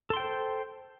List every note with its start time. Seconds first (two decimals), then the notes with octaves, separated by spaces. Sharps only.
0.10 A4
0.13 C6
0.17 G5
0.20 C5